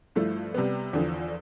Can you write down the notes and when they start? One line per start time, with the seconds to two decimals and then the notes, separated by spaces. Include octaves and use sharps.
0.16 G2 F3 A3 E4
0.54 C3 G3 B3
0.93 E2 D3 F3